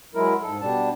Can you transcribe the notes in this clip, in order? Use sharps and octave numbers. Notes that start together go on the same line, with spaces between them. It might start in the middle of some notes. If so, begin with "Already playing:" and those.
F#3 G#3 E4 A#4
G#2 A4
B2 G3 D4 A5